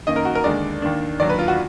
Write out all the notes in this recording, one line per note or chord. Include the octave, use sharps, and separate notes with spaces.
F#2 D#3 A#3 D#5
A#4
F#4
A#4
D#2 D3 G#3 D4 D5
D#2 D#3 A#3 D4
D#2 D3 F#3 D5
B4
F4
F#4